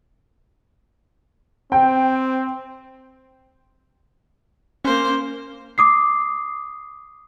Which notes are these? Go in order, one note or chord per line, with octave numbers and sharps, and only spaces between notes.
C4 G5
A#3 C#4 C5
D6 D#6 C7